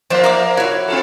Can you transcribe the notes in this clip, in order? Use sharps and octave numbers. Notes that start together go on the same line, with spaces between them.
F3 A#3 C5 D5 E5 F#5
A#4 D5 D6
E4 F#4 C#5
C4 F4 A4